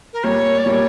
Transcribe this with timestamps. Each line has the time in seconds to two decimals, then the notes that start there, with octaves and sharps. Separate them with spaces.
0.13 A#4
0.24 A#2 G3 A#3 C#5
0.58 D5
0.65 A#2 G3 A#3 C#5